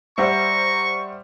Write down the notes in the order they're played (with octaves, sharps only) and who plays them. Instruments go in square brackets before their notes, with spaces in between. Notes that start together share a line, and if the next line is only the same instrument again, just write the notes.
[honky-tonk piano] G3 C5 [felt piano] E5 F#5 E6 [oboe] A#5 [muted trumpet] C#6